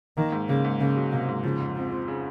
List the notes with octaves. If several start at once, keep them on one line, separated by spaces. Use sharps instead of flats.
D#3 A#3
G#2
C#3 A#3
G#2
C#3 A#3
F#3
C3 A#3
G#2
C#3 F3
F2
F3 C4
F3
C#3